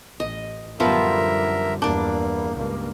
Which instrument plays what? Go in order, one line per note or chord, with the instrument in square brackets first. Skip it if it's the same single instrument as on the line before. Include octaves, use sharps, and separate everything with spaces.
[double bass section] A1 [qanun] D#5
[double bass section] F#2 D3 G3 [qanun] F3 B3 F4 [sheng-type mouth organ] A#4 E5
[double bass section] E2 G2 [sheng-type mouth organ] A#3 [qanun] D4 D5
[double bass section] C#2 G2 A#3